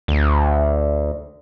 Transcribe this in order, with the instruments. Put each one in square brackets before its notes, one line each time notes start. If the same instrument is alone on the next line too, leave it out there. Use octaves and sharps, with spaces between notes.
[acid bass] D2